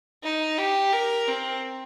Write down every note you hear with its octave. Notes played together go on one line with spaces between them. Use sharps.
D#4
G4
A#4
C4